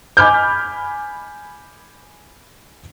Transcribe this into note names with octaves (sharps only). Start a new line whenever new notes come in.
G#5 B5 D6 F6 G6